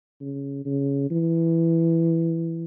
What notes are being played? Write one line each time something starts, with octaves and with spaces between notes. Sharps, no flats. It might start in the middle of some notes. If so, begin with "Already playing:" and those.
C#3
C#3
E3